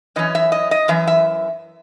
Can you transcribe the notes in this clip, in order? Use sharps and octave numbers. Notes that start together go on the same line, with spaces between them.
F#2 E3 C#4 D#5
E5
D#5
D#5
F#2 E3 E5
E5